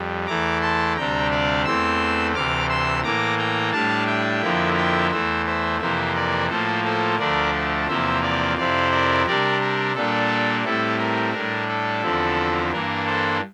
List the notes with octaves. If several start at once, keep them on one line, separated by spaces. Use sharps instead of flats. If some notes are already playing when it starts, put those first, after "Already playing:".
Already playing: F2 G3
E2 E3 A3 E4 A#5 D6
A5 C6
D2 C3 G3 D4 G5 A#5
D5 F5
E2 E3 A3 C4 C6 E6
D2 C3 E3 D6 F6
C6 E6
A2 E3 A#3 A#5 D6
G5 A#5
A2 G3 D4 F5 A5
E5 G5
F2 D3 F3 A#3 E4
E5 G5
E2 E3 A3 C5 E5
C5 E5
F2 C3 E3 A#3 C5 E5
A#4 D5
A2 F3 A#3 A4 C5
A4 C5
D2 D3 F3 A3 D4 A#4 D5
E2 C3 F3 A#3 C5 E5
D5 F5
F2 C3 F3 C4 E4 D5 F5
A#4 D5
C3 G3 D4 A#4 D5
A#4
A#2 G3 A#3 D4 A4
A2 G3 C4 E4 A4
A#4
A2 G3 D4 A#4
A4
E2 D3 F3 C4 E4
G2 E3 A#3 D4 A#4
A4 C5